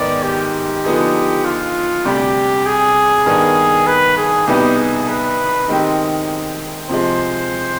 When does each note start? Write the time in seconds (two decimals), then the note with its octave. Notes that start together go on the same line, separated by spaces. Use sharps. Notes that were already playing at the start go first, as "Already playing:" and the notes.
Already playing: G#2 D#3 G#3 B3 D5
0.23 G4
0.85 D3 F3 B3 D#4 G#4
1.45 F4
2.05 D2 C3 G3 D4 G4
2.66 G#4
3.26 G2 D#3 B3 D4
3.87 B4
4.17 G#4
4.47 C2 B2 B3 D#4 G4 B4
4.77 G#4
5.08 B4
5.68 D#3 G#3 C4 D#4 G4
6.89 C3 F3 G#3 C5